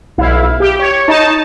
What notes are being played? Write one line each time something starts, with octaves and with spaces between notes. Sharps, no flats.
B1 E4 F5
G4
C#5
D#4 A5